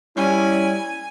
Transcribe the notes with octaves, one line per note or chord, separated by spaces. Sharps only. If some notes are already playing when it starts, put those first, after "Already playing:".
G3 C#4 E4 G#5